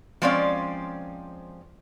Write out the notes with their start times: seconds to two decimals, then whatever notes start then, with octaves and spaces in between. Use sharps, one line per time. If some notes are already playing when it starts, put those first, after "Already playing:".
0.22 F3 G#3 C4 C#4 D5 F5